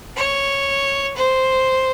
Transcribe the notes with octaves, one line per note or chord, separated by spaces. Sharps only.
C#5
C5